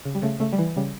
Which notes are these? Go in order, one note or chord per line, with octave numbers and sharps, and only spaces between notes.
C#3
G3
C#3 A3
C#3 A3
G3
E3
C#3 G3